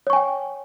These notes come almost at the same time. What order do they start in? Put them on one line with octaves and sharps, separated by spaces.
C#5 C#6 G#5 G5